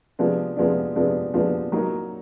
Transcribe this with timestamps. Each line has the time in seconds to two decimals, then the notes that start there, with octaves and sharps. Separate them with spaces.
0.19 C3 F3 G#3 B3 D4
0.57 C3 F3 G#3 B3 D4
0.95 C3 F3 G#3 B3 D4
1.34 C3 F3 G#3 B3 D4
1.72 F#3 A#3 D#4